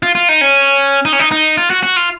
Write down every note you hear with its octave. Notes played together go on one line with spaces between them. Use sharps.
F4
F4
D#4
C#4
D#4
C#4
D#4
D#4
F4
F#4
F#4
F4